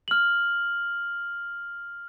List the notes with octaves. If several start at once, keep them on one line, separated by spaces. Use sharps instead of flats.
F6 F#7